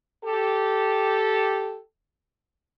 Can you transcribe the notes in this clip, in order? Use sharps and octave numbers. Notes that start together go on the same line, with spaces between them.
G4 A4